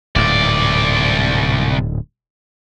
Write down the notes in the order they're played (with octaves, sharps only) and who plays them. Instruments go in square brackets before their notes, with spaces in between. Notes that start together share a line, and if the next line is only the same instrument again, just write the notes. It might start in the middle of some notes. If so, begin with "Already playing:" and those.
[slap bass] D1 G#2 [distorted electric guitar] C2 D5